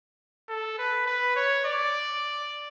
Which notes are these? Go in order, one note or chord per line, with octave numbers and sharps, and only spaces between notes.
A4
B4
B4
C#5
D5